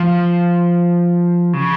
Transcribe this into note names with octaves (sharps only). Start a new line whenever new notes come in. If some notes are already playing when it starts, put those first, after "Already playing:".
Already playing: F3
C#3